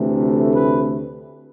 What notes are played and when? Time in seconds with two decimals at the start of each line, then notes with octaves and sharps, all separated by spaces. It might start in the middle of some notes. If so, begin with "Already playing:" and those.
Already playing: D2 C3 E3 A3
0.55 B4